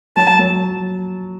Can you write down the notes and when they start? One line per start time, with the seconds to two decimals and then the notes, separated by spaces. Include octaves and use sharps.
0.17 F#3 A5
0.39 F#3